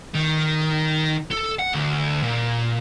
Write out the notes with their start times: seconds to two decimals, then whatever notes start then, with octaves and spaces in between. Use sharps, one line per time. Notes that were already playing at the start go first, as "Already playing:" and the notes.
0.14 D#3
1.31 A4
1.59 F#5
1.73 D2
2.23 A#2